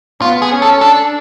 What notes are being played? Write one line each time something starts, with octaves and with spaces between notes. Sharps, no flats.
B3 F4
G#4
C#4
A4
D4 A4